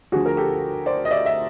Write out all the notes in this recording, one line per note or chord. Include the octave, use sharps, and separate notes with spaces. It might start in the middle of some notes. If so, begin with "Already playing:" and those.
D2 D3 F3 F#4 G#4
A#4
G4 A4
C5 D5
D#5
D5 E5
E5